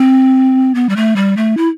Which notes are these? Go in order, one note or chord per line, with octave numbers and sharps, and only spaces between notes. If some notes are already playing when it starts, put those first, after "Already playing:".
Already playing: C4
B3
G3
A3
G3
A3
E4